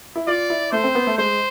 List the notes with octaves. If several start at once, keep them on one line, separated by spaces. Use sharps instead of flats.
E4
F4 D5
E4
A3 C5
C4
B3
A3
G#3 C5